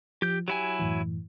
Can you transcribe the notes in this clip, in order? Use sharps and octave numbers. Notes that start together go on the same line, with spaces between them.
F3 G4 G6
F#3 E4 G4 G#5
F#2 A2 E3